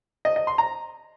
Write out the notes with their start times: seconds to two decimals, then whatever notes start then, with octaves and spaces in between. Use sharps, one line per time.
0.25 D#5
0.36 D#5
0.47 C6
0.58 A#5